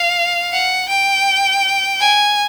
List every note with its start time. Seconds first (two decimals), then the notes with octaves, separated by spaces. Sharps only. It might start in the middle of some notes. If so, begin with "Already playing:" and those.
Already playing: F5
0.52 F#5
0.89 G5
2.00 G#5